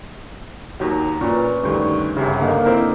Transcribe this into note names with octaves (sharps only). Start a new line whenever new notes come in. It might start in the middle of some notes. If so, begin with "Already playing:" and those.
D#2 D#3 F#3 A#5
A#2 C#4 B4
D2 G2 D#3 C#6
G1 C2 C#3
D3 A#3 D#4
C4 E4 A#4